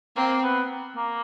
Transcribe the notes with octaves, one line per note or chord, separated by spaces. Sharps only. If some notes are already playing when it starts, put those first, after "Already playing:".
A#3 C4
B3
A#3